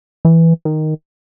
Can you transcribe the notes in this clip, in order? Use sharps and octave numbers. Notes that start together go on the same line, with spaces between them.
E3
D#3